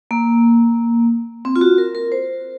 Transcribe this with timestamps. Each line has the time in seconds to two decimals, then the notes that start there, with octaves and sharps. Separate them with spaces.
0.11 A#3
1.45 C4
1.56 F4
1.61 F#4
1.78 A#4
1.95 A#4
2.12 C5